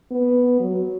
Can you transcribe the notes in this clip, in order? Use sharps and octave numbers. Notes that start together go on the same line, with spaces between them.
B3
F#3